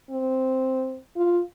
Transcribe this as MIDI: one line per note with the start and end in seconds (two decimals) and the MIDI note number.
0.11 0.99 60
1.17 1.40 65